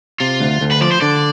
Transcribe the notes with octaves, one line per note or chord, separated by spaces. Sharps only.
C3 F4
D2
D2
B4
F3 D5
C5
D3 D5